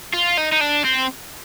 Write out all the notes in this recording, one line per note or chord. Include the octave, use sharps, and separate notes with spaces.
F4
D#4
D#4
D4
C4